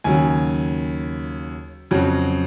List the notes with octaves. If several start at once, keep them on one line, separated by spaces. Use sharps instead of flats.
D#2 C#3 F#3 G#5
F2 C#3 F#3